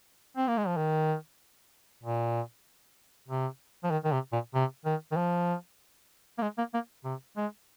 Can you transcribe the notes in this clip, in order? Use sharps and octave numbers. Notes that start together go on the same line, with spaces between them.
C4
A#3
G#3
F3
D#3
A#2
C3
F3
D#3
D#3
C3
A#2
C3
D#3
D#3
F3
A#3
G#3
A#3
A#3
C3
G#3